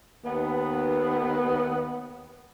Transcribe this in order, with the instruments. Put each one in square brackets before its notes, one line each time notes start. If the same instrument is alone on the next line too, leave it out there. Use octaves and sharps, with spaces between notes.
[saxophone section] D#2 B3